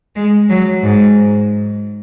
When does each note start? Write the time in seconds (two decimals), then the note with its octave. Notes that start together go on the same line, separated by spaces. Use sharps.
0.15 G#3
0.49 F#3
0.83 G#2